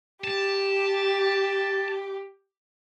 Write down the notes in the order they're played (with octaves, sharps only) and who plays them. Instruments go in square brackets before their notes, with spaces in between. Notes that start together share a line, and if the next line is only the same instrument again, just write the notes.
[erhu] G4 [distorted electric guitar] A5